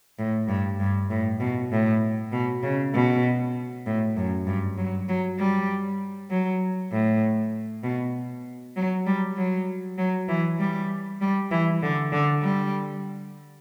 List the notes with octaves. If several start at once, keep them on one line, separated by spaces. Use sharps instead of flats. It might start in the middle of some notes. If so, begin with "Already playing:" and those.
A2
G2
G2
A2
B2
A2
B2
C#3
B2
A2
F#2
G2
F#3
F#3
G3
F#3
A2
B2
F#3
G3
F#3
F#3
E3
G3
G3
E3
D3
D3
G3